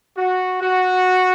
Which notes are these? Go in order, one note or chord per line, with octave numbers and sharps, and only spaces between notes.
F#4
F#4